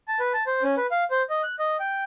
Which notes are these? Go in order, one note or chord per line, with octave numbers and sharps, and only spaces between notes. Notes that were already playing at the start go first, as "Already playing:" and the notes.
A5
B4
A5
C5
C#4
B4
F5
C5
D#5
F#6
D#5
G5